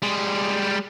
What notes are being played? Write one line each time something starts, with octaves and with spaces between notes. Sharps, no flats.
G3 G#3